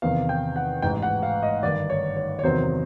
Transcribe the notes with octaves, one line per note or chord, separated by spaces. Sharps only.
E2 C3 D#3 F5
G5
F#5
A1 G#2 E3 G5
F#5
F5
D#5
G1 G2 D#3 D5
C#5
C#5
C#5
E2 C3 D#3 F#3 C5